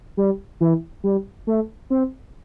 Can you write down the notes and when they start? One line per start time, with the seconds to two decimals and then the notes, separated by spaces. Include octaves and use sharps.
0.17 G3
0.60 E3
1.04 G3
1.47 A3
1.90 C4